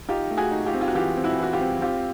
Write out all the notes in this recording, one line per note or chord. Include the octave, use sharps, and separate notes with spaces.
D#4 F4 G4
A3
F#4 G#4
D#4
F4 G4
C4
F4
F#4
E3 F4 G4
C4
E4 F#4
E3 F#4
F4 G4
C4
C4 F4 G4